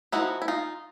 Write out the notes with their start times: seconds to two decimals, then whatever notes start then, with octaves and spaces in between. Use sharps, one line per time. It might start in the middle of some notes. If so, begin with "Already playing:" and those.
0.12 A#3 D#4 E4 F#4
0.17 F3
0.42 E4
0.48 D#4 F4